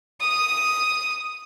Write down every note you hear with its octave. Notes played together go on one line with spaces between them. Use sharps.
D#6